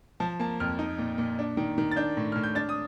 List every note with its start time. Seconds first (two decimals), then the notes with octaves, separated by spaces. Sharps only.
0.20 F3 A5
0.39 A#3 A5
0.60 F2 F6
0.79 D#4
0.98 A#2
1.18 A#2
1.39 D4
1.57 D#3
1.78 D#3
1.91 A6
1.96 D4 G6
2.17 A2
2.32 A2 F6
2.44 G6
2.55 D4 A6
2.69 D#6